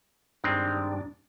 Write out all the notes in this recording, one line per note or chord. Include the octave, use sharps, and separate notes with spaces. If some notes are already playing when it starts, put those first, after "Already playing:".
G2 D#3 G#3 C4 D4